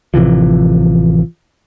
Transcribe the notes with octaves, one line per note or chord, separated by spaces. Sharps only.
A1 C3 E3 F3